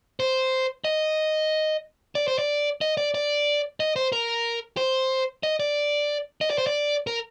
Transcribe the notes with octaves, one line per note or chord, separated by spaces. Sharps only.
C5
D#5
D5
C5
D5
D#5
D5
D5
D#5
C5
A#4
C5
D#5
D5
D#5
D5
C5
D5
A#4